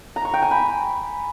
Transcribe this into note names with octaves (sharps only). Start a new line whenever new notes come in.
A#5
C#6
G5
G#5
B5